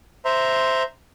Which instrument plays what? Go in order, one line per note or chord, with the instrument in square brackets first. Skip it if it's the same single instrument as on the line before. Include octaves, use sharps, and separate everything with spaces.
[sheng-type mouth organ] C5 E5 A#5 C6